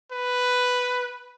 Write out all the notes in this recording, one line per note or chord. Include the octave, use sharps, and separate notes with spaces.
B4